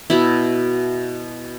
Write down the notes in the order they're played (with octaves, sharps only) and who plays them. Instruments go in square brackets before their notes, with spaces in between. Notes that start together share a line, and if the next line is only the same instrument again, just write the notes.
[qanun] B2 E4